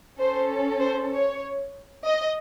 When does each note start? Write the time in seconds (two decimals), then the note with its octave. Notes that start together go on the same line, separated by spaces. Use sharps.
0.19 C#4 A4 C5
0.81 C5
1.13 C#5
2.06 D#5